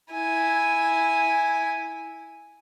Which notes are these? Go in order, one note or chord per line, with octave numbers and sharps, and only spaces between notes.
E4 G#5